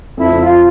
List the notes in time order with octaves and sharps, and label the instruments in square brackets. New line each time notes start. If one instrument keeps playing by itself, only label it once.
[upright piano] F2 [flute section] E4
[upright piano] F2
[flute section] F4